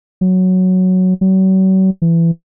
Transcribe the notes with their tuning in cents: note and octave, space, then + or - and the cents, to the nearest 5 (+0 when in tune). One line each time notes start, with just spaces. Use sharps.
F#3 +0
F#3 +40
E3 +20